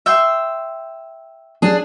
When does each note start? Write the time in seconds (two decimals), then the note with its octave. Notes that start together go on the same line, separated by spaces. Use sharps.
0.06 E5 G5 C6
1.62 D4 G#4